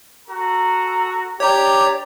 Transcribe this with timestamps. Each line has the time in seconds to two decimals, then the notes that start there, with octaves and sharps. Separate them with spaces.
0.28 F#4 A4 A#5
1.40 D4 G4 C#5 D5 A#5